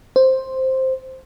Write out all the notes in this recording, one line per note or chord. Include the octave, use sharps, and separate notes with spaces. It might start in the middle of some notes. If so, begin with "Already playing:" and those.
C5